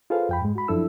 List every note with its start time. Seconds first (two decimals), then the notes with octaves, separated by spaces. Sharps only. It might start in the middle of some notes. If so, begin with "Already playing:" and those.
0.10 F4 G#4 A4 B4 C5 F5
0.29 F2 G5 B5
0.41 G#2 G#3
0.55 F#4 B5
0.68 F#2 F3 D4 E4 A4 E6